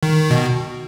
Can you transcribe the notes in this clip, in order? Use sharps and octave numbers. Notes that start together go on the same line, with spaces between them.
D#3
B2